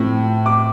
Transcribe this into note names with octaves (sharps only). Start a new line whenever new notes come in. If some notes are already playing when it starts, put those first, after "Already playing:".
Already playing: A2 F3 C4
D6